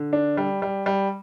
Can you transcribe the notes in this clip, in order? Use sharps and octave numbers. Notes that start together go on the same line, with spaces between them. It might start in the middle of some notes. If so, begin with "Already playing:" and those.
Already playing: D3
D4
G3
G3
G3